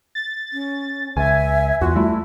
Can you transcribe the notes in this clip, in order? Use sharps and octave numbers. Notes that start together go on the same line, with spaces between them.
A6
C#4
C#2 E5 G#5
E2 F4 F#4
G3 A3 E4